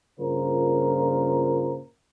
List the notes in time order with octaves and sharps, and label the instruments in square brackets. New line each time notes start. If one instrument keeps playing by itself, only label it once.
[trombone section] G2 A#2 C#3 F4 A#4 C5